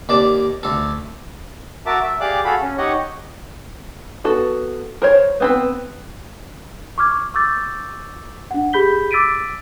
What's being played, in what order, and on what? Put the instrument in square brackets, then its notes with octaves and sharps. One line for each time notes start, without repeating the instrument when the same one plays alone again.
[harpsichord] D#2 D5 A5
D2 A4
[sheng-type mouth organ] F#4 A#4 E5 A5 D6
E5
G4 G#4 D5 F5 D6 F#6
F#4 G#4 A4 F5 B5
C#4
D#4 G4 C#5 D#5 F#5 C#6
[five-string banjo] B3 F#4 A4
A#4 C5 C#5
B3 C4 B4
[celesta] C#6 D6 F6 G#6
C#6 D6 E6 G6 A6
D4 F#5
G4 G#4 B5 G6 B6 G7
D6 E6 A6 B6 D7 D#7